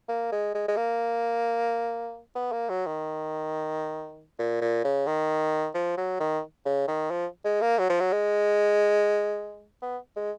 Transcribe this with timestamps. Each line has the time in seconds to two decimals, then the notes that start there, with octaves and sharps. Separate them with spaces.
0.09 A#3
0.32 G#3
0.54 G#3
0.68 G#3
0.77 A#3
2.35 B3
2.52 A#3
2.69 F#3
2.86 D#3
4.39 A#2
4.61 A#2
4.84 C#3
5.07 D#3
5.75 F3
5.97 F#3
6.20 D#3
6.65 C#3
6.88 D#3
7.11 F3
7.45 G#3
7.61 A#3
7.79 F#3
7.89 F3
8.00 F#3
8.13 G#3
9.82 B3
10.16 G#3